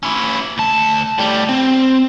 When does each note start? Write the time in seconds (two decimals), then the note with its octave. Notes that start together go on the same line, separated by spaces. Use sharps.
0.03 C#4 E4
0.58 D2 A5
1.18 A2 G3
1.49 C4